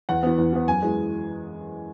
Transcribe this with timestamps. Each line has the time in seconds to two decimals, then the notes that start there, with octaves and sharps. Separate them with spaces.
0.09 E2 F#5
0.23 E3 B3
0.38 E2
0.53 E3 B3
0.67 F#2 G#5
0.82 E3 G#3